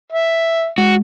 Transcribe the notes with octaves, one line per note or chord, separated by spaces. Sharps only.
E5
G#3 F#4